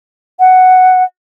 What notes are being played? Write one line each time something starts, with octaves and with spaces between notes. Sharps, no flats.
F#5